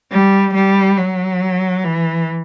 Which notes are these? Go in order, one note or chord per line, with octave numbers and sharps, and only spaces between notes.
G3
G3
F#3
E3